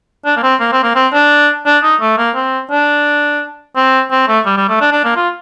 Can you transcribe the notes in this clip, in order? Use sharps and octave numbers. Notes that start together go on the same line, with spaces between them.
D4
A#3
C4
A#3
C4
A#3
C4
D4
D4
D#4
A3
A#3
C4
D4
C4
C4
A3
G3
G3
A3
D4
D4
A#3
F4